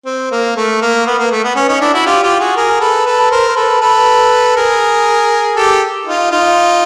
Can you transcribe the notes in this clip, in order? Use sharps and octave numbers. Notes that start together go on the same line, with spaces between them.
C4
A#3
A3
A#3
B3
A#3
A3
B3
C#4
C#4 D#4
D4 E4
E4 F#4
F4 G4
F4 G4
F#4 G#4
G#4 A#4
A4 B4
A4 B4
A#4 C5
C5
A4 B4
A4 B4
G#4 A#4
G4 A4
D#4 F4
D#4 F4